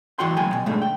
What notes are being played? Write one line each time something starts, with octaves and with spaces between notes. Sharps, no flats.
G2 E3 F#4 G5 C6
D2 F#3 G5 G#5
B2
G#2 B2 D3 G3 A3
G5